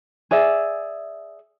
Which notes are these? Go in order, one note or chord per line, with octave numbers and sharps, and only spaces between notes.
G#4 D5 E5